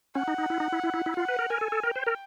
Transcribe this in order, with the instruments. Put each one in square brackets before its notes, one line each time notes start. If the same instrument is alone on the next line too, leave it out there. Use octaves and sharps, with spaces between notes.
[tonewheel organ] C#4 [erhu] F#5
[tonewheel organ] D#4
D#4
E4
D#4
E4
E4
E4
E4
[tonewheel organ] F4 [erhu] F#5
[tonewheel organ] B4
A#4
[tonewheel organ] A#4 [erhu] G#5
[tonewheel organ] A4
A4
[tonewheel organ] A#4 [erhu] G5
[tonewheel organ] C5
A#4